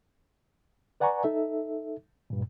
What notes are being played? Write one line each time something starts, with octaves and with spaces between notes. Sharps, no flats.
B4 D5 F#5 G#5 A#5 C#6
D#4 A4 E5
G2 A#2